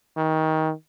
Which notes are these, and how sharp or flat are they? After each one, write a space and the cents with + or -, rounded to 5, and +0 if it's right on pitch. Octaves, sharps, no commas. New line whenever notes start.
D#3 +20